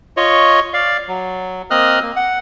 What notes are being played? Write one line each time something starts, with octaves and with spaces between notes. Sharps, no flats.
F4 C#5 D#5 C#6
D5 F5
F#3
A#3 C4 D#5 D#6 F6 F#6
A#3
F#5